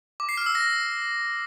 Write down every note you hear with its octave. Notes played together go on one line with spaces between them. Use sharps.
D6
C7
F6
E6
A#6